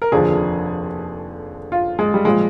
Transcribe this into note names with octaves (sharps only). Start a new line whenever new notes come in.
A#4
F1 D#2 D3 F3 G#4
F4
G#3
G3
A#2 F3 G#3